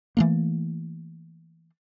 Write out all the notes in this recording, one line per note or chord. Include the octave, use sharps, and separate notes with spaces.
E3 A3 A#3